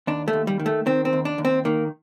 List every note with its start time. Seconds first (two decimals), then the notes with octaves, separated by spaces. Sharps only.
0.07 D#2 D4
0.28 A3
0.33 D#2
0.47 G3
0.60 D#3
0.66 A3
0.86 D#3 C4
1.05 C4
1.13 D#2
1.25 D4
1.38 D#2
1.45 C4
1.65 D#3 A#3